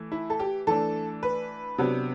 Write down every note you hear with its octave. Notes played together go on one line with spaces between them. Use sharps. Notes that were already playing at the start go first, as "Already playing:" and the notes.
Already playing: E3 A3
E4
A4
G4
E3 A3 D4 A4
B4
C3 F#3 B3 D4